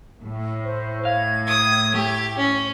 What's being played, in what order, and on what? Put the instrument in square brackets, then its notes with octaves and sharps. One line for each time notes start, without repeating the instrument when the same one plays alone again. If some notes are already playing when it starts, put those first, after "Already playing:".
[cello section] A2
[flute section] C5
[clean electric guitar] F5 [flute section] G#6
[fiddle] D#6
[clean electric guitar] A3 [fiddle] G4
[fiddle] C#4